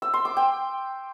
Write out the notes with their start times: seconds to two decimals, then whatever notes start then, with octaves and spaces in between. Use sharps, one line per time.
0.02 E6
0.14 C6
0.25 D6
0.37 G5